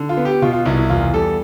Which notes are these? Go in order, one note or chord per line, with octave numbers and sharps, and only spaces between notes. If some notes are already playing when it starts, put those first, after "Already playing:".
Already playing: D3
F4
B3
G4
B2 F4
F4
C2 E4
E4
E2 F4
G3 A4